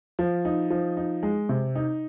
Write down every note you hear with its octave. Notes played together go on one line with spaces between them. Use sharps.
F3
D#4
F3
D#4
G#3
C3
D#4